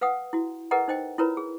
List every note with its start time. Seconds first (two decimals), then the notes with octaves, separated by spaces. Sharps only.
0.01 B4 F5 F#5 D#6
0.33 E4 F#4
0.71 G#4 A#4 B4 D#5 F#5 A#5
0.88 D#4 C5 D#5 G5
1.18 E4 F4 A#4 B4 C#5 A#5
1.37 G#4